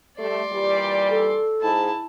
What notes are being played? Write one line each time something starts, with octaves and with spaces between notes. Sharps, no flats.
G3 A3 D5 C6
A#2 E3 G3
A4
G#2 E4 A5